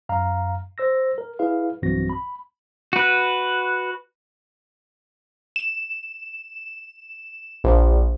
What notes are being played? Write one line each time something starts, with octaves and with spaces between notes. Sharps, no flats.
F#2 F5 A#5
C5 E6 A#6
A#4
E4 G#4 B4 F5
B1 G2 E3 C4 F#4 A#6
B5
F#4 B4
E7
A#1